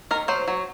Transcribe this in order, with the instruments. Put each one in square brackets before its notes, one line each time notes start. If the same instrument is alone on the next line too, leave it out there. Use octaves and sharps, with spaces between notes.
[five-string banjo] D#3 A#4
F#3 C5
F#3